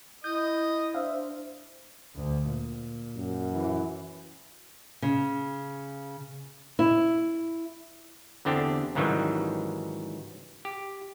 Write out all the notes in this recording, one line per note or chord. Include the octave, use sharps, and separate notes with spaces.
E4 D#5 G6
D4 C5 E5 F5
D2
A#2
F#2
E3
C#3
E4
E2 D3 C4 D4 G4
C#2 G#2 D#3 E3 F#3 G3
G4